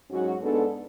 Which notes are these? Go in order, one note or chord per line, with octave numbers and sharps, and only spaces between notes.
G#2 F#3 C#4 F#4
G#2 G#3 B3 D4 A4